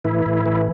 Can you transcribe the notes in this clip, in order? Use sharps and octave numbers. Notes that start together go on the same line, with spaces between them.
A2 E3 E4
A2
E3